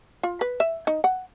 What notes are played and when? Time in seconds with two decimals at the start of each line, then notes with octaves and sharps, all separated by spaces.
0.23 F4
0.41 B4
0.60 E5
0.87 D#4
1.04 F#5